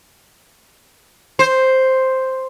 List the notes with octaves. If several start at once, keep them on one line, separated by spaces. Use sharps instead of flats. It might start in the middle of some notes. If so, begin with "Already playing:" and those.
C5